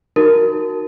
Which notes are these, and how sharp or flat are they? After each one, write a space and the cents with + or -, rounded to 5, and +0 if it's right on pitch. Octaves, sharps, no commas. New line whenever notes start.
D#4 +0 F#4 +0 A#4 +0